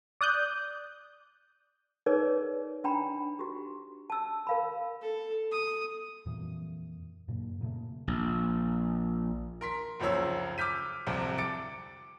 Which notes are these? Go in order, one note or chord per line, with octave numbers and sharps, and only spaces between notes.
D5 D#6 F#6 G6
D#4 G#4 A#4 B4 C#5 D5
D4 G5 A#5 B5
F#4 G4
A5 E6
A#4 F5 B5
A4
D#6
F2 A#2 E3
F#2 A#2 C#3
A#2 C#3 A3
A#1
A#4 C6 B6
F1 C#2 F#2 F3 C#5 E6
D6 E6 F6 G6 B6 D#7
D1 C2 F2 C3
D6 A6 C#7 D7